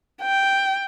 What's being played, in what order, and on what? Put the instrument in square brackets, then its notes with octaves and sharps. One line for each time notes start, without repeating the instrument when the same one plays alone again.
[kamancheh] G5